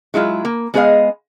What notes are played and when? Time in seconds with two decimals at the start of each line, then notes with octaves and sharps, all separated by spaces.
0.14 F#3 G#3 E4 F4
0.45 A#3
0.74 G#3 B3 G#4 B4 D#5 F5